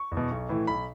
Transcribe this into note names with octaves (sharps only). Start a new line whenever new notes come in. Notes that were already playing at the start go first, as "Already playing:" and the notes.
Already playing: C#6
E2
B2
B1
A2 E3
B1 B5